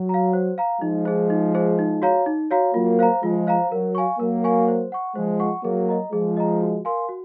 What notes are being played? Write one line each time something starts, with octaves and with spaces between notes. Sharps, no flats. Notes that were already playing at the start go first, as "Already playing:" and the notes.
Already playing: F#3
F5 A#5
C5
F5 A#5
F3 G#3 D#4
G#4 C5
D#4
G#4 C5
D#4
F#4 C#5 F5 A#5
D#4
F#4 C#5 F5 A#5
F#3 A#3 F4
C5 F5 A#5
F3 G#3 F4
C5 F5 A#5
F#3 A#4
F5 G#5 C#6
F#3 A#3 A#4
F5 G#5 C#6
C5
F#5 C#6
F3 G#3 C5
F#5 C#6
F#3 A#3 G#4
D#5 A#5
F3 G#3 G#4
D#5 A#5
F#4
A#4 F5 G#5 C6
F#4